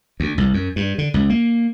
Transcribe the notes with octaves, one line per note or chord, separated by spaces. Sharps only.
D2
C2
F#2
G2
D3
C#2
A#3